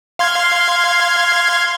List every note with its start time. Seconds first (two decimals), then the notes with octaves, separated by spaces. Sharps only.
0.19 F5 C6 G#6